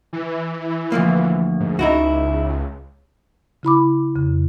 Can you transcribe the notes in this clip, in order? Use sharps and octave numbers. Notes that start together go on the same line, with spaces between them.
E3
D2 F3 A#3
G#2
C#2 D#4 E4 F#4
C#3 E4 B5 D6
F2 C#3